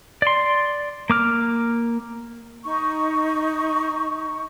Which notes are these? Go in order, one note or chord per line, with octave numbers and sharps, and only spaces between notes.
D5 C6
A#3 D6 F6
D#4 C#6